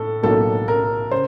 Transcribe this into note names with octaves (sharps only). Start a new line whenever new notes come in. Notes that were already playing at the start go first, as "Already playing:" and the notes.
Already playing: A2 A4
B1 A2 F#3 A#3 A4
A#4
C#3 C5